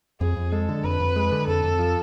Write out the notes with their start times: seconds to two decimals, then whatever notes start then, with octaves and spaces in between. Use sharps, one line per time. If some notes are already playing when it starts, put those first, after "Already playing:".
0.21 F2 G#4
0.36 F2
0.52 G#3 A4
0.69 D3
0.84 F2 B4
1.00 F2
1.16 G#3
1.32 D3
1.47 F2 A4
1.64 F2
1.79 F3